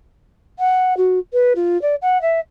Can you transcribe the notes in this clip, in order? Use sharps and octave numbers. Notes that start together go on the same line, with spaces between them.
F#5
F#4
B4
F4
D5
F#5
E5